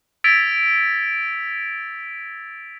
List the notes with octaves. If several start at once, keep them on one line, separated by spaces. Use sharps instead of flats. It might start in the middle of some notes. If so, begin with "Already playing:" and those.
E6 G#6 A6 B6 D7 F7